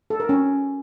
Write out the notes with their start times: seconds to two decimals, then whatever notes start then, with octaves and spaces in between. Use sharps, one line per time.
0.10 A4
0.20 A#4
0.29 C#4